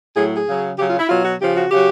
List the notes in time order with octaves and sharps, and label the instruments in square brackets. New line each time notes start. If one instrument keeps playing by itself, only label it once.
[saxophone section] A2 F#3 G#4
G#4
C#3 F#3
C#3 F#3 G4
F4
E4
B2 F#3 F4
F#4
C#3 F3 G4
F#4
C#3 F#3 G4